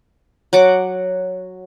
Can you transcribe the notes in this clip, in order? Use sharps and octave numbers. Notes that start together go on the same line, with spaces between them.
F#3 F#5 D6